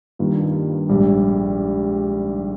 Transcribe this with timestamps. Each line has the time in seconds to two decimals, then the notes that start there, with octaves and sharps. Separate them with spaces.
0.19 G2 D#3 A#3 F4
0.89 A#1 G#2 G3